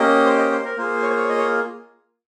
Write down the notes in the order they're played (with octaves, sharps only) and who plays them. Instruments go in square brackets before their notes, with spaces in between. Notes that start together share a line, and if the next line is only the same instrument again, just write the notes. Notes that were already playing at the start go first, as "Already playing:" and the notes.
Already playing: [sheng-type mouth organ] A#3 C#4 G4 D#5
C5
D#5
C5
A#4
A#3 F4 G#4 C5
C#5
C5
C#5
D#5
C#5